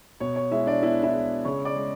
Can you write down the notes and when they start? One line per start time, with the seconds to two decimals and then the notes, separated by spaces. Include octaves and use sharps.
0.20 B2 C#5
0.36 C#5
0.51 G#3 E4 E5
0.66 D4 D5
0.83 B3 E4 E5
1.03 E4 E5
1.13 G#3
1.45 C#3 C#5 C#6
1.65 D5 D6
1.76 G#3